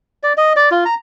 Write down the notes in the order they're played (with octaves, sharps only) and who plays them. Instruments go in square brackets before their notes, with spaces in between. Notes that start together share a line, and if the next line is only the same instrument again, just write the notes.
[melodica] D5
D#5
D5
F4
A#5